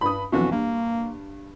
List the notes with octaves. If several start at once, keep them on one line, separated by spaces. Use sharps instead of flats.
G2 B5 D#6
B1 F2 E3 F#4
G2 A#3